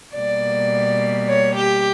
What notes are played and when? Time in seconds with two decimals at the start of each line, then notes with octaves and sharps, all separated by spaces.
0.14 B2 G3 A#3 D5
1.28 C#5
1.57 G4